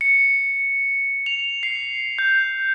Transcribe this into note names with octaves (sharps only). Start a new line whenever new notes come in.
C#7
F7
C7
G6